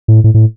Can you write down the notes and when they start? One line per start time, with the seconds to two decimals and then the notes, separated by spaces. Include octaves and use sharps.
0.08 A2
0.24 A2
0.34 A2